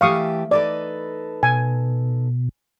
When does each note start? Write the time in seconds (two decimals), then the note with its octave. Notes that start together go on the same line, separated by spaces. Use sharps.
0.01 E3 A3 G4 F5 C#6 D#6
0.51 D#4 A4 B4 D5
1.43 B2 G#5